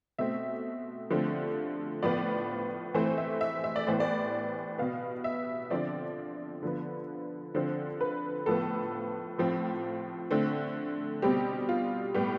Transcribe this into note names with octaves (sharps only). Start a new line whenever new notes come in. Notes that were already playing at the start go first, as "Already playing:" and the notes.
B2 A3 C4 E5
D3 F3 A3 C4
A2 F3 B3 D5
E3 A3 C4 C5
E5
E5
E5
D5
A2 E3 B3 C5
D5
B2 B3 F5
E5
D3 F3 C4 D5
D3 F3 B3
D3 F3 C4 C5
B4
A2 F3 B3 A4
A2 F3 C4
D3 A3 C4
B2 G3 C4 G4
F4
A2 G3 B3 G4